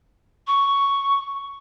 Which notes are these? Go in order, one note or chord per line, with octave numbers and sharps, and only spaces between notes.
C#6